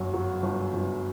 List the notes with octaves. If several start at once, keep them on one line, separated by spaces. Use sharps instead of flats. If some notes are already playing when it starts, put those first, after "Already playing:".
Already playing: G1 F#2 F#4
F#3
G1
G1